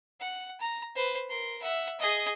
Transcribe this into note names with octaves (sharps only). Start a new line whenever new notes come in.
F#5
A#5
B4 C5
A#4 C6
E5 F#5
G#4 D#5